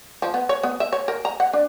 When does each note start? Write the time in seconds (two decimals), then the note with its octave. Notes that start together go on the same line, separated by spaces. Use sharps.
0.22 F3
0.34 B3
0.49 C#5
0.63 B3
0.80 E5
0.93 C#5
1.08 A#4
1.25 A#5
1.40 F#5
1.53 D4